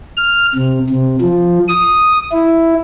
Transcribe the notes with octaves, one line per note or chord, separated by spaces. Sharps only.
F6
C3
C3
F3
D#6
E4